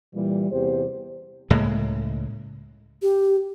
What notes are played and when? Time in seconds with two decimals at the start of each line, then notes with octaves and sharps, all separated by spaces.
0.15 A#2 E3 G3
0.52 E2 C3 G4 C5
1.50 C#2 A2 G#3 A#3
3.02 G4